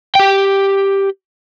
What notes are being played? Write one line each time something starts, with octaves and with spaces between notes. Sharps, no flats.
G4 G5